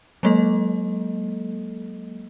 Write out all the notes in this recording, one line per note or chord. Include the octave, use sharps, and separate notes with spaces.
F#3 G#3 A#3 A4 D#5